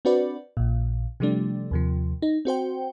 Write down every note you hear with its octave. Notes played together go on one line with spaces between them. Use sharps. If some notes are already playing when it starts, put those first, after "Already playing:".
C4 D4 F#4 B4 D5
A#1 A#2
C3 F3 G3 A3 D4
D#2 C3 F3
D#4
C4 F#4 C5 G5